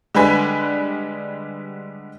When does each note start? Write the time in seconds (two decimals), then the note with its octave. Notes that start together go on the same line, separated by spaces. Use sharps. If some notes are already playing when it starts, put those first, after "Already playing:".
0.15 D3 G3 G#3 B4 G#5 B6